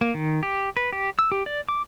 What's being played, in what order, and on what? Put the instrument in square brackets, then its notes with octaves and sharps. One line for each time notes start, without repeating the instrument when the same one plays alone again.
[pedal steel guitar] A#3
D#3
G4
B4
G4
E6
G4
D5
D6